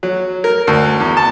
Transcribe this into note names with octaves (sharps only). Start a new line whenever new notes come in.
F#3
A#4
D2
E2
A5